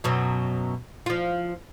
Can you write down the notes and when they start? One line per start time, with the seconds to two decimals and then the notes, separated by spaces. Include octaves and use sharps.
0.04 F#2 B2 F#3
1.06 F3 F4